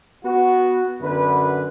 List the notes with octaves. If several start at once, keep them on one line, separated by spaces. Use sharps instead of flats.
B3 F#4
F#2 D3 B4